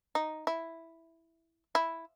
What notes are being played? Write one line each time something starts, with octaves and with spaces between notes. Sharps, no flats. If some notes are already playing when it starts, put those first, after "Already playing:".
D#4
E4
E4